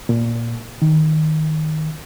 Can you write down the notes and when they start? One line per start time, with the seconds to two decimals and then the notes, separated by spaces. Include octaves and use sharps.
0.09 A#2
0.82 D#3